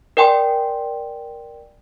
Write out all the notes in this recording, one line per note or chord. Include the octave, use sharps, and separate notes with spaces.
A#4 D5 G5 G#5 C6